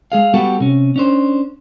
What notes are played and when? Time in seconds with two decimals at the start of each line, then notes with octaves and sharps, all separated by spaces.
0.12 G#3 G#4 F5
0.34 G3 B3 F#4 G4 A4
0.60 C3 C#4
0.96 C#4 D4 C5